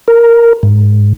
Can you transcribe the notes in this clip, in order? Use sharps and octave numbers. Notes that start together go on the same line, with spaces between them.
A#4
G#2